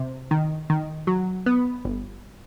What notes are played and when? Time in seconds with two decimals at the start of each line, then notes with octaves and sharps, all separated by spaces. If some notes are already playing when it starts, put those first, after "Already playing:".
Already playing: C3
0.31 D#3
0.70 D#3
1.07 F#3
1.46 B3
1.85 G1